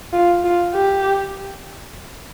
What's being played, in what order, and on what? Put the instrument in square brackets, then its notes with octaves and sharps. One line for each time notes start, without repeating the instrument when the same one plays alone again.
[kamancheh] F4
F4
G4